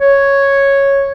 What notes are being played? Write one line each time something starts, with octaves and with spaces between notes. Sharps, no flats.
C#5